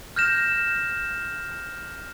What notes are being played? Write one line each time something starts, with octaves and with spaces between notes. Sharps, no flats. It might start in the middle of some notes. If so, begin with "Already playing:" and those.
F6 G6 A#6 E7